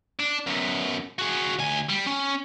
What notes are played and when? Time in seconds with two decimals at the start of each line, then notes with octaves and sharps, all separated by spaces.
0.20 D4
0.47 F#2 B2
1.19 F#4 G#4
1.59 D2 G#5
1.90 G3
2.07 C#4